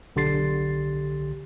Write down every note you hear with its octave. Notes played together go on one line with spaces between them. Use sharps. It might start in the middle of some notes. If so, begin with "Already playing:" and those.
B1 D3 G4 C6 A6 C7